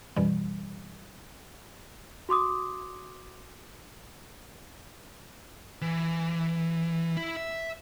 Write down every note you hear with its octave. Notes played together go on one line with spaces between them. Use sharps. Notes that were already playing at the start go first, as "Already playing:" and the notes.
F#2 B2 E3 G3
F#4 C6 D6 D#6
E3
E4
E5